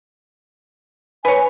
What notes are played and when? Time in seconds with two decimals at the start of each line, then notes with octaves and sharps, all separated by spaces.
1.25 B4 C#5 G#5